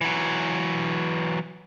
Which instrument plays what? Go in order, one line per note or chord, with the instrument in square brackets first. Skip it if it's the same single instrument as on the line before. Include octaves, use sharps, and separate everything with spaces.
[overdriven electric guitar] E3 F#3